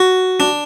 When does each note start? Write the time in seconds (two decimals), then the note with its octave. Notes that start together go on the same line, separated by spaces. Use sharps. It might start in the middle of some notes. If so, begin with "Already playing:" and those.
Already playing: F#4
0.40 D4